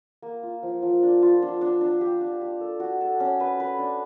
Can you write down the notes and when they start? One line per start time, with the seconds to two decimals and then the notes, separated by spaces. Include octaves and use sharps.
0.22 A#3
0.43 F4
0.63 F3
0.83 F3
1.03 D4
1.22 F4
1.42 D4
1.61 D4
1.81 D4
2.01 G4
2.21 D4
2.41 G4
2.61 A4
2.80 F#4
3.01 A4
3.20 C#4
3.40 B4
3.60 B4
3.79 D4